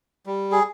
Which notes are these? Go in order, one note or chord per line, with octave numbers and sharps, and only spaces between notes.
G3
G#4